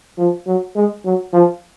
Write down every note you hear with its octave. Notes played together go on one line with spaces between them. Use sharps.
F3
F#3
G#3
F#3
F3